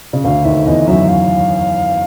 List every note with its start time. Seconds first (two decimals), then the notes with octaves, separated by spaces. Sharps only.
0.13 C#3
0.24 D2 D3 F5
0.44 D#2 D#3 E5
0.66 E2 E3 D#5
0.87 F#2 F#3 E5
1.08 F5